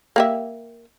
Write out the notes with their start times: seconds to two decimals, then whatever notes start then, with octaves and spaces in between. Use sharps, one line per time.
0.16 A#3 G4 E5